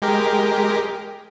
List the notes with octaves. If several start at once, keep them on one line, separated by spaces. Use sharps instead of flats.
G#3 G4 A#4